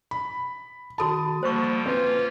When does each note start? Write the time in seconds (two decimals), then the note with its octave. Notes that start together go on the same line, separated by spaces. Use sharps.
0.11 B5
0.98 D#3 F#4 A4 A5 B5 D#6
1.43 D3 F3 G3 A#3 C5 C#6
1.86 A#3 C4 C#4 F4 B4